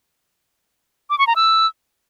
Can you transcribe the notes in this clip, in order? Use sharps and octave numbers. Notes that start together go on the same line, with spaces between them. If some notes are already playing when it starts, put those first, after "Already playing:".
D6
C#6
A#5
E6